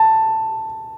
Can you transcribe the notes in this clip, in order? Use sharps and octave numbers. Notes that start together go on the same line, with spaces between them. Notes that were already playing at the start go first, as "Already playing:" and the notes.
Already playing: A5